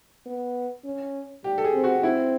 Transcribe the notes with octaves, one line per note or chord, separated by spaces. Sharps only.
B3
C#4
G3 G4
A4
G#4
C4
F#4
C4 E4